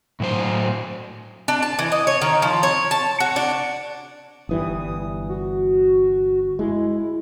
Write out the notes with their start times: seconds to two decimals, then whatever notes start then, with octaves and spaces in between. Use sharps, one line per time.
0.20 A2 F#3 C5
1.48 D4
1.63 A5
1.79 E3
1.92 D#5
2.07 C#5
2.22 D#3
2.42 F3
2.63 C#5
2.91 A5
3.20 F#4
3.36 D4
4.49 G1 E3 G3 D#6
5.29 F#4
6.59 G#3 E4